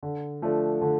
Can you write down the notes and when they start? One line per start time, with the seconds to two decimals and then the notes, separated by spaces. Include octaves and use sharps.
0.03 D3
0.42 F3 A3 D4
0.82 D3